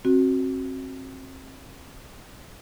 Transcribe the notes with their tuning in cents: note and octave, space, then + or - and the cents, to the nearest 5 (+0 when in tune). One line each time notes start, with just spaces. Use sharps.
C4 +35 F#4 +0